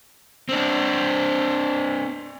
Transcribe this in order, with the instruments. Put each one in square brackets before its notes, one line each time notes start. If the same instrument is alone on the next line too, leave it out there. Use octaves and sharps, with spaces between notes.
[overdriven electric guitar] C4 D4